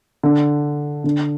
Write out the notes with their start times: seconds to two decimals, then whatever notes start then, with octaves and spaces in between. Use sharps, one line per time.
0.23 D3
1.04 D3